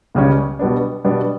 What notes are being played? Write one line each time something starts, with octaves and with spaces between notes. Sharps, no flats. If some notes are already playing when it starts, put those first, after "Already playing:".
C#2 C#3 G3 C#4
B2 G3 B3 D4
B2 G3 B3 D4